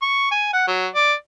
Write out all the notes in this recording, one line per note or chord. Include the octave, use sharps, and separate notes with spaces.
C#6
G#5
F#5
F#3
D5